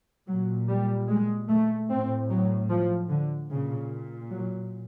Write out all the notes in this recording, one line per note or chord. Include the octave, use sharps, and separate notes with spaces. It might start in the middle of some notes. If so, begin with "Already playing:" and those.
A#2 F#3
G3
G#3
A3
A2 C4
F#3
F3
D3
A#2 C#3
F#3